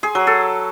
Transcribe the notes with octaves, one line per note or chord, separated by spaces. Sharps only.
G#4
F#3
A4